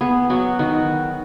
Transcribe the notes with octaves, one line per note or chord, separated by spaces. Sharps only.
B3 G#4
F#3 F#4
D#3 F#4